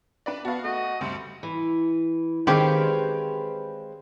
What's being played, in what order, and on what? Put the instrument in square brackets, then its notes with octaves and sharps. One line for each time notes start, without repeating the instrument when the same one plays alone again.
[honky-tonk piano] D4 B4 D5
[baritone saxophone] B3 [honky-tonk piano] F#4 F5 [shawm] A5
[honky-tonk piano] A3 [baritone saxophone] F#4 [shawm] D#5
[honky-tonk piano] D2 G2 [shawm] C5
[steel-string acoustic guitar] E3
[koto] D#3 G4 [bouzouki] G#3 C4 F5 [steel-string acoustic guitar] B4 C#5 G5